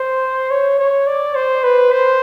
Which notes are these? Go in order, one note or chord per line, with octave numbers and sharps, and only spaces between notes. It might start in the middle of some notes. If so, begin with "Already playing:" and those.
Already playing: C5
C#5
C#5
D5
C5
B4
C5